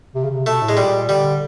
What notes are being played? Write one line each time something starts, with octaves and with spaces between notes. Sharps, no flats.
C3
C#3
C3
B2 A3
A2
G#3
A#2 G3
D3 G3